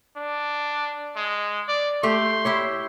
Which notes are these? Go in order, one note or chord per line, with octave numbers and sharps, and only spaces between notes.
D4
G#3
D5
A3 G4 C6
E4 G4 C#5